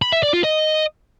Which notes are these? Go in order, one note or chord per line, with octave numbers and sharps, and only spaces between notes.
B5
E5
D5
F4
D#5